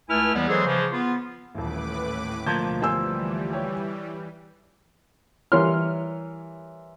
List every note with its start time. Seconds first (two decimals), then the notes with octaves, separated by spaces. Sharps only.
0.09 C#2 A3 E4 B4 G#5 F6
0.34 D#2 E3 G3 G#3 B3
0.47 E3 F#3 G#3 G#4 A4 C5
0.66 C#3 E3 F3
0.92 B3 F4
1.54 D#1 A1 A2 B4 D6
2.46 D2 B2 F3 A#3 A5 G6 G#6
2.82 E3 G3 C5 G#5 E6 G6
3.53 G4 C#5
5.52 E3 G3 A#4 C#5 C6 F6